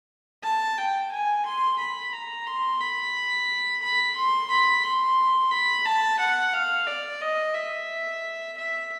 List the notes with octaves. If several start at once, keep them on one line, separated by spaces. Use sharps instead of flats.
A5
G5
G#5
C6
B5
A#5
C6
B5
B5
C6
B5
C6
B5
A5
F#5
F5
D5
D#5
E5
E5